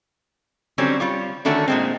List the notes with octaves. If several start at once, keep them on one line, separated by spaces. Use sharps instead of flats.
D3 F#3 G3 C4 C#4
G3 F4 C#5
D3 D#3 A3 C#4 D4 F#4
A#2 G#3 C4